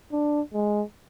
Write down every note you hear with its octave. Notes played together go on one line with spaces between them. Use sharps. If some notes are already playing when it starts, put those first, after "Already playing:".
D4
G#3